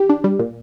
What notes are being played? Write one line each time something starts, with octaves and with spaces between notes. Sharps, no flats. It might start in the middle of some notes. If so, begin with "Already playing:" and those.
Already playing: E3 G4
D4
G3
A#2